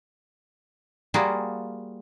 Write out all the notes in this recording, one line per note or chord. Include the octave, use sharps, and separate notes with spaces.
G3 A#3 F4 F#4 G#4